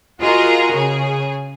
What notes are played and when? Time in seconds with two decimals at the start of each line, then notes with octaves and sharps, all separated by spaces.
0.20 F4 F#4 G#4 A#4 D#5 A#5
0.72 C#3 G#4